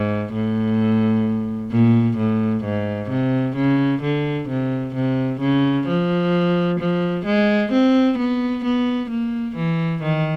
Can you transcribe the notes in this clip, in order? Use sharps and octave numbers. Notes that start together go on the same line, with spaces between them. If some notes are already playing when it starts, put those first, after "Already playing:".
Already playing: G#2
A2
A#2
A2
G#2
C3
C#3
D3
C3
C3
C#3
F3
F3
G#3
C4
B3
B3
A#3
E3
D#3